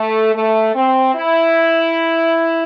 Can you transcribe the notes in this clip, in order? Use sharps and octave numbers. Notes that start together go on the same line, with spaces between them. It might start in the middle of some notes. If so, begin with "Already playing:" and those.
Already playing: A3
A3
C4
E4